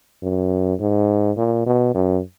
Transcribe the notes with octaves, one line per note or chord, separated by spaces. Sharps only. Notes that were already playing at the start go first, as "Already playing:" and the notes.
F#2
G#2
A#2
B2
F#2